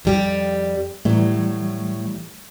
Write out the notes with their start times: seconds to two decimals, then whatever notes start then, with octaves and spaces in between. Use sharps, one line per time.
0.05 F2 G3 G4
1.05 A2 E3 F#3 G3 A3